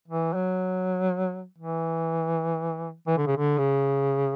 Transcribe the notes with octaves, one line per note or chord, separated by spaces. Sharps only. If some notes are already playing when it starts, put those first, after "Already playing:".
E3
F#3
E3
E3
D3
C#3
D3
C#3